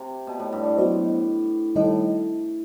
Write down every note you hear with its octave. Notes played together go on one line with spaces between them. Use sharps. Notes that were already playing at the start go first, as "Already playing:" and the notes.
Already playing: C3
B2
A2
G2
A2
F#3 B3 F#4 C5 D#5
A2 D#3 G3 D#4 A4 D#5